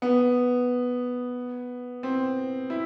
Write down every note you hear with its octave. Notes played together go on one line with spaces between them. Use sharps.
B3
C4
E4